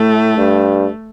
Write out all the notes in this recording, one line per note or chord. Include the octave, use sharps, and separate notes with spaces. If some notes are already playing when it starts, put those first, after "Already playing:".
Already playing: A2 A3
G2